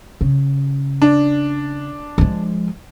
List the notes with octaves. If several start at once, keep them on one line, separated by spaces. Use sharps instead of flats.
C#3
D4
F3 G#3